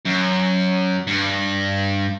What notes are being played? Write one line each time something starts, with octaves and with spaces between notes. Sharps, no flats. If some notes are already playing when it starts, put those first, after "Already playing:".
F#2
G2